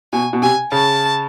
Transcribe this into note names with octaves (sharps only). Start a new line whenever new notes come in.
B2 G#5
B2
C3 G#5
C#3 A5